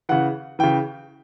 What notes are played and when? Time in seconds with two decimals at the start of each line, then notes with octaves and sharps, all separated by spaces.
0.09 C#3 E3 F#5
0.59 C#3 E3 G5